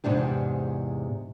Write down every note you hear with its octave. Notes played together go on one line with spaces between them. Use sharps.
E2 G#2 C3 D4 G4